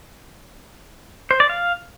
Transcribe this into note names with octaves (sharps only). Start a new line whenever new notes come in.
C5
D5
F5